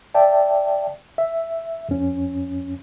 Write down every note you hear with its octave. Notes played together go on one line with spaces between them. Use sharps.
D5 E5 G5 A5
E5
F2 C#4